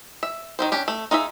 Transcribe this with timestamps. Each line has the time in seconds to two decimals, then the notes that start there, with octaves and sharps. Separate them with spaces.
0.23 E5
0.59 D#3 E3 C5
0.72 C#4 D4 G4
0.88 A3
1.11 D#4 F4 G#4 E5